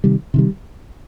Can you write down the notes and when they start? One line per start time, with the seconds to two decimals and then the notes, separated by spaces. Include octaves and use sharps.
0.04 C3 D#3 G3
0.34 C3 D#3 G3